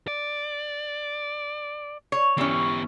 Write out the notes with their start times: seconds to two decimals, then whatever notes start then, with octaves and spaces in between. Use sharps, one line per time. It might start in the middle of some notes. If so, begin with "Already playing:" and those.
0.08 D5
2.12 C#5
2.38 E3 B3 C#4 G4